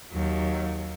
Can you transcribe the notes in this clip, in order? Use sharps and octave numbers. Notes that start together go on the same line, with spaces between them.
D#2 F#3